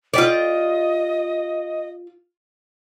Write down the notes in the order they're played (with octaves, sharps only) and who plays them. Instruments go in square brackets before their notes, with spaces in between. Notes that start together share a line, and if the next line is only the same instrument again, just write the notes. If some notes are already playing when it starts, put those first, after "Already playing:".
[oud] F4 G4 D5 [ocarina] D#5